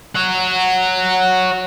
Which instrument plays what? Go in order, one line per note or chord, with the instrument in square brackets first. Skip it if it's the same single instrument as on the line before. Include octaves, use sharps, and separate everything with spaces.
[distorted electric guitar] C#5 F#5